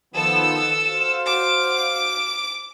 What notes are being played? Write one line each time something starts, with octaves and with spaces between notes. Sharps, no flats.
D#3 F3 B3 A4 E6
F#4 C5 F5
D6